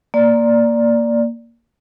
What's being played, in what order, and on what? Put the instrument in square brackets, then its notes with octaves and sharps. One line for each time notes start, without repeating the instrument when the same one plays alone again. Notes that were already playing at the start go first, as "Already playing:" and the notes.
[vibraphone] A#3 D5